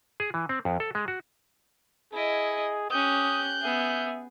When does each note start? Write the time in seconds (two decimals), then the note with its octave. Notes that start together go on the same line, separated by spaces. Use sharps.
0.20 G#4
0.34 E3
0.49 C4
0.65 F2
0.80 A4
0.95 G#3
1.08 F#4
2.13 E4 G#4 D#5
2.91 C#4 G4 D#6 F#6 G6
3.63 B3 G#4 E5